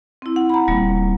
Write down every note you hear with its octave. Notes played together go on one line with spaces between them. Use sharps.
C4 E4
F#5
A#5 B5
D#1 G3 A#3